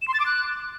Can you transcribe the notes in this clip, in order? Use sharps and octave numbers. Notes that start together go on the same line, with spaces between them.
E7
C6
A6
D6
F#6